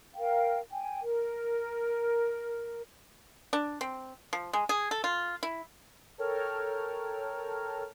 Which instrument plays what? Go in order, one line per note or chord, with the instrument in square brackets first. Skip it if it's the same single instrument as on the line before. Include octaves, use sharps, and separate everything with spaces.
[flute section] A#4 F5 G5
G5 G#5
A#4
[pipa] D4
C4
F3
G#3
G#4
A4
F4
E4
[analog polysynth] A4 A#4 C#5 G5 A5 F6